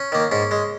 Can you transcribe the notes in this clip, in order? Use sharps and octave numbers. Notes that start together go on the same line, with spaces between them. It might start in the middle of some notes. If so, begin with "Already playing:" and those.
Already playing: C#4
D#3 A#3
G#2 C#4
G#3